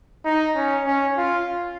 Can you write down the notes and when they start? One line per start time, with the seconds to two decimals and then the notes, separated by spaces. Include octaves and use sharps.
0.25 D#4
0.55 C#4
0.87 C#4
1.17 F4